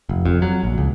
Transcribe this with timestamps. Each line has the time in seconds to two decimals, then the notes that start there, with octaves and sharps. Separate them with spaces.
0.09 F1
0.26 F2
0.42 F#3
0.64 A#1
0.78 C#2